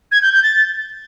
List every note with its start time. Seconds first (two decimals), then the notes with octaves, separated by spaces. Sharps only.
0.11 G#6
0.22 G6
0.32 G6
0.43 A6